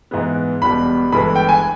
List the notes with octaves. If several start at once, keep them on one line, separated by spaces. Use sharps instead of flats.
G#2 E3 G#3 B3
E1 E2 B2 G3 B5
G1 G2 E3 G#3 B5
G5
G#5